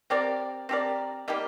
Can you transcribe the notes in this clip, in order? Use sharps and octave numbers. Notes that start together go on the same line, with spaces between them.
C4 G4 A#4 D5
C4 G4 A#4 D5
G3 A#3 D#4 G4